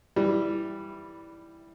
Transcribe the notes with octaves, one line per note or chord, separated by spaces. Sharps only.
E3 G3